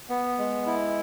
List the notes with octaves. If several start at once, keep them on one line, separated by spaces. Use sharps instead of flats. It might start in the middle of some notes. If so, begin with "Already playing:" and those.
B3
G#3
E4